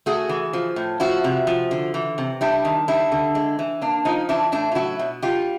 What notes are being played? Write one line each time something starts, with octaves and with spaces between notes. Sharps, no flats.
A3 F#4 G#4
E3
F3
A2
F3 E4 F#4
C3
F3
D3
E3
C3
G3 D4 E4
D#3
G3 D4 E4
D3
G#3
E3
A#3 D4
F3 D#4
E3 D4 E4
A2 D4 E4
F4
F#3 E4 F#4
B2
G3 F4 G4